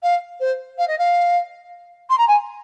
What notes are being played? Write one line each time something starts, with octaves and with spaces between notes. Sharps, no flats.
F5
C5
F5
D#5
F5
C6
A#5
G#5